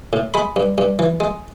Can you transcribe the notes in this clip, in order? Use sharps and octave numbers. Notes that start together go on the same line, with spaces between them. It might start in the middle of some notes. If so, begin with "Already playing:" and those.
A2
G#3 B5
G2
G2
E3
G#3